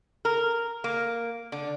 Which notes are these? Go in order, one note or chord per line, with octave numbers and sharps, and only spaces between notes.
A#4
A#3
D3